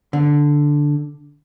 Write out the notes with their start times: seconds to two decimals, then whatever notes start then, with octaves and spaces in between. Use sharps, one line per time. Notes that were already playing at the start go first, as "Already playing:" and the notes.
0.13 D3